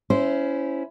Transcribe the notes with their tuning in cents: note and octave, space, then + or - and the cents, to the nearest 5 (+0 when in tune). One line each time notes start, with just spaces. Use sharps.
C#4 +10 E4 +0 C5 -15